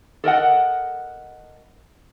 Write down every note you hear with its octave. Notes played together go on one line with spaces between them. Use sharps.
A4 A#4 D#5 F#5